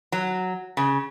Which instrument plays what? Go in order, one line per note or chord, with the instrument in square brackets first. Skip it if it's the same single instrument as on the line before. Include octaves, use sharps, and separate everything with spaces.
[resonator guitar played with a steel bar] F#3
C#3